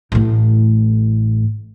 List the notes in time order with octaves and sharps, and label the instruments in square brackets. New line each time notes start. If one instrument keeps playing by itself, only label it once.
[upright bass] A1 A2